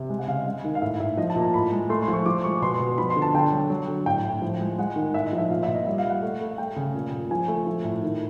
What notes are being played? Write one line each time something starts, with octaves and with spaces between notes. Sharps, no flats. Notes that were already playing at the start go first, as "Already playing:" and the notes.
Already playing: C3
G#3
F#5
C#3 F5
D#5
G#3
D#3
F5
A2 E5
A2 E5
F3 D#5
A5
A#2
A#5
A2 B5
G#3
A3 C6
C6
F3
C#6
F3 D6
G#3 C#6
B2 C6
C6
B2
F3 B5
C6
D3
A5
D3 G5
F#3
F#3
D3
A2 G5
A2
F3
G#3
G#3 F#5
D#3
A2 E5
D#5
F3
E5
A#2 F5
E5
A#2
D#5
G3 E5
F5
G3
F#5
A3
A3
A3 G5
C#3
A#2
A#2
F3 G#5
A3
F3
A2
D#3